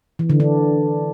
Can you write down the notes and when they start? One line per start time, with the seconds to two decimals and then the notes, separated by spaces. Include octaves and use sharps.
0.19 E3
0.30 D3
0.40 D4